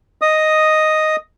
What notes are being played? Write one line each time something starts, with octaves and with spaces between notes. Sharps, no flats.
D#5 D#6